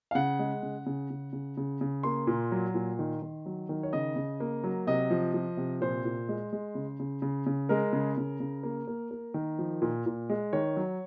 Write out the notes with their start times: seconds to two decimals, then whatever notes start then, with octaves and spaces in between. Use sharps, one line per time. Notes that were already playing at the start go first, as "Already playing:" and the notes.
0.11 F5
0.15 C#3 F#5
0.39 G#3
0.63 C#3
0.86 C#3
1.10 C#3
1.33 C#3
1.57 C#3
1.81 C#3
2.03 A#3 C6
2.27 A#2
2.52 F#3
2.74 A#2
2.99 D#3
3.22 D#3
3.46 F#3
3.69 D#3
3.83 C#5
3.93 C#3 D#5
4.16 C#3
4.40 A#3
4.64 F#3
4.87 C3 D#5
5.10 F3
5.34 F3
5.57 C3
5.81 A#2 C5
6.05 A#2
6.29 G#3
6.52 G#3
6.75 C#3
7.00 C#3
7.22 C#3
7.46 C#3
7.69 G#3 A#4
7.93 C#3
8.17 C#3
8.40 C#3
8.63 A#3
8.87 A#3
9.11 A#3
9.34 D#3
9.59 F3
9.82 A#2
10.06 A#2
10.29 G#3
10.53 D#3 C#5
10.76 F#3